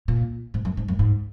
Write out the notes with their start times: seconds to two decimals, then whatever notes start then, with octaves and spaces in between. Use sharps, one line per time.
0.08 A#2
0.54 G#2
0.65 F#2
0.77 G#2
0.88 F#2
0.99 G#2